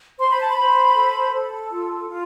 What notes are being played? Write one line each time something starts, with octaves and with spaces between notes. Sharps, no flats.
C5 C6
B5
A5
B5
C5
A4
A4
F4
F4